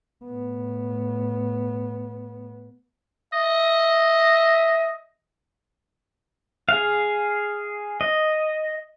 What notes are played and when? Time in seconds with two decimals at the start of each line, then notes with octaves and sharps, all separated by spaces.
0.25 A2 B3
3.34 D#5 E5
6.69 G#4 F5
8.01 D#5